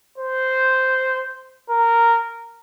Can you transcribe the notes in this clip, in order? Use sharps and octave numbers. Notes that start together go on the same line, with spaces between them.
C5
A#4